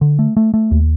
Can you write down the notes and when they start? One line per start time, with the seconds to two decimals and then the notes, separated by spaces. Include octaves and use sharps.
0.01 D3
0.19 A3
0.37 A3
0.54 A3
0.71 D#2